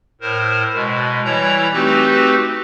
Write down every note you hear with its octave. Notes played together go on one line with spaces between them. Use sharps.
A2 A#4 C5
B2 G#3
E3 G3 E4 C#5 A#5
A3 C4 D#4 F#4 G4 B4